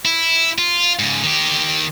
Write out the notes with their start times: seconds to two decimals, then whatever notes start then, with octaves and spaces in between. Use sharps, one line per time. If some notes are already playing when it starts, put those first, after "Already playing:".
0.05 E4
0.58 F4
0.99 G#2 C#3
1.24 D#3 G4